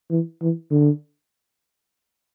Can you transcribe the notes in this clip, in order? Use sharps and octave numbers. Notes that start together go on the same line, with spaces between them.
E3
E3
D3